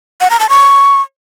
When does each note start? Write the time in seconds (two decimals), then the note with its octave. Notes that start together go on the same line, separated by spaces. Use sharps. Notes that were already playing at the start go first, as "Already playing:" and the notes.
0.21 F#5
0.30 A#5
0.40 A5
0.49 C#6